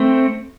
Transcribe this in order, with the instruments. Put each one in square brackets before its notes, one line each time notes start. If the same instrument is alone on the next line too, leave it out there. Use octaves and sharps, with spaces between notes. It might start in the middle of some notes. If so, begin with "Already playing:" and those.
Already playing: [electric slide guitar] A3 C4